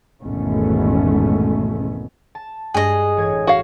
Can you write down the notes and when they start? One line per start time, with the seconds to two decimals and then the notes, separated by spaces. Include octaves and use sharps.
0.22 G#1 E2 G#2 B2 A3 C#4
2.35 A5
2.74 G2 G#3 G#4 D#5 F#6
3.17 A1 C#5 G#6
3.47 F#4 F5